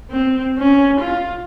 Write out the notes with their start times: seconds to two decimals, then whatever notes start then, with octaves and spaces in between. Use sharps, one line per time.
0.10 C4
0.58 C#4
1.00 F4